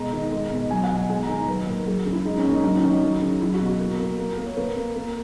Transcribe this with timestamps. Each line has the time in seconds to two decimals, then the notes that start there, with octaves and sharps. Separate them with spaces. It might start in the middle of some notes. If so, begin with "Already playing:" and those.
Already playing: B2 G#3 A#5
0.13 D#3
0.32 G#3
0.51 B2
0.70 F#3 G#5
0.84 F#5
0.90 B2
0.97 G#5
1.09 G#3 G#5
1.22 A#5
1.29 D#3
1.35 A#5
1.48 F#3 B4
1.67 A#2 A#4
1.87 F#3 G#4
2.06 C#3
2.13 E4
2.25 G#3 D#4
2.38 C#4
2.45 A#2
2.51 D#4
2.64 F#3 D#4
2.76 C#4
2.83 D#3
2.89 D#4
3.02 F#3
3.22 C#3
3.41 F#3 E4
3.54 F#4
3.61 B2
3.67 F#4
3.80 A#3
3.99 A#3
4.18 A#3 A#4
4.37 A#3
4.46 C#5
4.57 A#3 B4
4.76 A#3
4.96 A#3